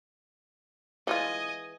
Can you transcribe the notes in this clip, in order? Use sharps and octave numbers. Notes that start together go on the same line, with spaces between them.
E3 G#3 F4 D#5 G#5